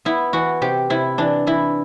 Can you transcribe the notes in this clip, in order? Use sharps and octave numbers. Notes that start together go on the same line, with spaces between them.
B3 E4
E3 F#4
C3 G4
C3 E4
E3 D4
E3 E4